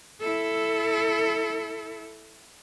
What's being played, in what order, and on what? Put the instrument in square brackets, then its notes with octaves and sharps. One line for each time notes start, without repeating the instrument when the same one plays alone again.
[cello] E4 A4